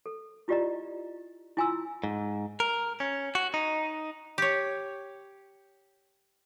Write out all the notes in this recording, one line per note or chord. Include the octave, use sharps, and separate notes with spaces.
A4
E4 F4 G4 D5 D#5 A#5
E4 F4 G#5 A#5 C6 E6
G#2
A#4
C#4
F#4
D#4
G4 C#5